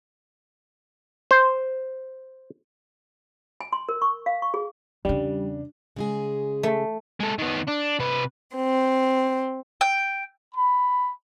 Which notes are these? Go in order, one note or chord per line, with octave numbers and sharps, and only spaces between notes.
C5
G#5
C6
A#4
C#6
F5
C#6
G#4
E2 C#3 G3 D4
C#3 G#3 G#4
A3
G#3 A4
D#3 B3
D4
C3 B4
C4
G5
B5